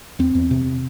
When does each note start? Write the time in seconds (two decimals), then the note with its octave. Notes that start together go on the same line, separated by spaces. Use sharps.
0.19 E2 C4
0.35 E2
0.51 C3